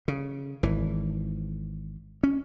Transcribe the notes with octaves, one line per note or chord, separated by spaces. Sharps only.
C#3
G#1 E3
C#4